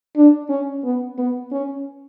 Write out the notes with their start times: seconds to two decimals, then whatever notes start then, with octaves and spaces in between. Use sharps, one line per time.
0.16 D4
0.50 C#4
0.84 B3
1.18 B3
1.52 C#4